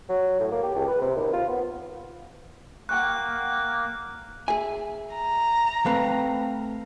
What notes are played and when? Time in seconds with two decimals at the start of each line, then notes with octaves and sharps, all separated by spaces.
0.09 F#3
0.40 A2
0.52 A#3
0.63 G4
0.75 C#2
0.88 B4
1.01 C3
1.16 D#2
1.33 F4
1.49 B3
2.89 A#3 F#5 G5 C#6 F#6
4.48 G#4 E5 G#5
5.14 A#5
5.86 A3 C4 B4 F5